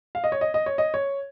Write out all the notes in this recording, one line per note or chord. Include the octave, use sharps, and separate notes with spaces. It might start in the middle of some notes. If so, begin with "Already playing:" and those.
F5
D#5
C#5
D#5
D#5
C#5
D#5
C#5